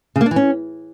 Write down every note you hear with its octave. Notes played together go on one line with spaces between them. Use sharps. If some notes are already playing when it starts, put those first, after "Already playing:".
C#3
A#3
D4
E3
C#4